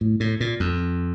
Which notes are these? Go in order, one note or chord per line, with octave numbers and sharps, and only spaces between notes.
A2
A2
A#2
F2